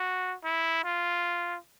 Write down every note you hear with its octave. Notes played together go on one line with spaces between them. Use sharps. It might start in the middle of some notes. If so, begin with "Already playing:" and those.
Already playing: F#4
E4
F4